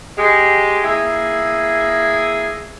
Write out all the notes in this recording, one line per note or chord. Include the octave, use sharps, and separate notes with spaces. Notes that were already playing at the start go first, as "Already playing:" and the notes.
G#3 G4
A#3 E4 G#4